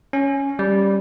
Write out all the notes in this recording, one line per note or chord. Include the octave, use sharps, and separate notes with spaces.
C#4
G3